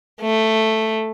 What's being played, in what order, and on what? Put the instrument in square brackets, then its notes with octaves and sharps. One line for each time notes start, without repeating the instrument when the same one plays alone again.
[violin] A3